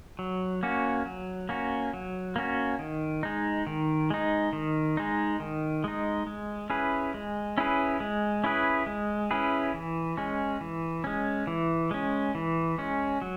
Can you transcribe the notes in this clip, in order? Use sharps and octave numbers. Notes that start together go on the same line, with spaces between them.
F#3
A#3 C#4 F#4
F#3
A#3 C#4 F#4
F#3
A#3 C#4 F#4
D#3
G#3 D#4
D#3
G#3 D#4
D#3
G#3 D#4
D#3
G#3 D#4
G#3
C#4 E4 G#4 B4
G#3
C#4 E4 G#4 B4
G#3
C#4 E4 G#4 B4
G#3
C#4 E4 G#4 B4
E3
G#3 C#4
E3
G#3 C#4
E3
G#3 C#4
E3
G#3 C#4
F#3